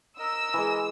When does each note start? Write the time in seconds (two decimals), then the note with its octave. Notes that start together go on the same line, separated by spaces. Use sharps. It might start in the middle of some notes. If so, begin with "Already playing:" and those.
0.19 A#4 D#5 E6
0.54 E3 G#3